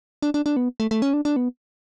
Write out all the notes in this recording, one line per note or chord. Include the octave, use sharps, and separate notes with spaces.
D4
D4
D4
B3
A3
A3
C#4
D4
D4
B3